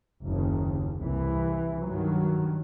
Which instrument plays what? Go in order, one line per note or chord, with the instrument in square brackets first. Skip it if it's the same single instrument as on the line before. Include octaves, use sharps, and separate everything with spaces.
[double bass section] F#1 D#2 C#3
C2 E3
G2 D#3 F#3